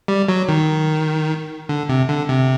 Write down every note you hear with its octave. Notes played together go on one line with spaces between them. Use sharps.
G3
F#3
D#3
D3
C3
D3
C3